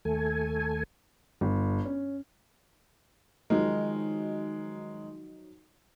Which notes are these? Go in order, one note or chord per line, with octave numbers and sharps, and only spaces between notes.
D#2 A3 A4 G#5
G1
C#4
D#3 F3 F#3 G#3 D#4 A#4